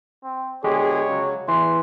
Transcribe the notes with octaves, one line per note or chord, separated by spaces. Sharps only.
C4
B2 D3 G#3 G4 G#4 C#5
C#3 F#3
E2 E3 C6